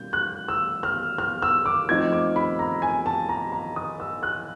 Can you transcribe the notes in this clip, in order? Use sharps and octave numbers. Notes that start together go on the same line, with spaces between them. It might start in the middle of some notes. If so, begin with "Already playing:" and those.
Already playing: B2 G3 A#3 C#4 G6
F#6
E6
F6
F6
E6
D6
F3 A3 C4 D#4 G#6
D6
B5
A#5
G#5
A5
A#5
A#5
D#6
E6
F#6